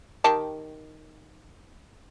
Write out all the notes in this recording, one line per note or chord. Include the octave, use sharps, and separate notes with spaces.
D#3 G4 A5